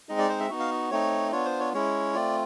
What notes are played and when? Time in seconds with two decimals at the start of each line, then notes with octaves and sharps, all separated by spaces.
0.09 G#3 C4 D#4 D#5
0.18 D5
0.29 C5
0.40 E5
0.50 B3 D#4 F#4
0.59 F5
0.91 A3 C4 D#4 C#5
1.32 B3 D4 F4 C#5
1.45 C5
1.60 C#5
1.74 G#3 C#4 E4 C#5
2.14 A3 C4 F4 D5